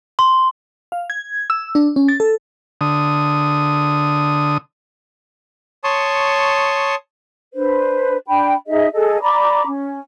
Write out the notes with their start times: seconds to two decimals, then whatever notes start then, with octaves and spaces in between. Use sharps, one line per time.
0.19 C6
0.92 F5
1.10 G#6
1.50 E6
1.75 D4
1.96 C#4
2.08 A6
2.20 A4
2.81 D3 D#6
5.84 C#5 A5 C6 C#6 D#6
7.54 D4 B4 C5
8.27 D4 G5 B5
8.67 D#4 G#4 D#5 E5
8.93 G#4 A4 D#5
9.20 D5 A#5 B5 D6
9.65 C#4